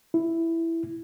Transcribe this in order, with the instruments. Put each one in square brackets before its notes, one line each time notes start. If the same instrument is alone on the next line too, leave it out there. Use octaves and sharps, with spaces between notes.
[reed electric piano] E4